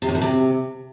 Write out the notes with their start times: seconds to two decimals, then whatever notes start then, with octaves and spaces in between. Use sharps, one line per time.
0.02 C3
0.08 F#2
0.15 A2
0.21 C3